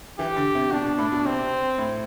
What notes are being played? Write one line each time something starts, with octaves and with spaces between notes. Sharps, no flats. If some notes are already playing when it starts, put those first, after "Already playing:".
E3 G4
D3
C3
B2 D4
B2
A2
B2
C3 C4
A2